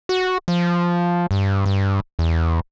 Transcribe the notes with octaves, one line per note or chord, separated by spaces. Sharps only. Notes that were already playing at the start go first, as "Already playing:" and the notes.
F#4
F3
G2
G2
E2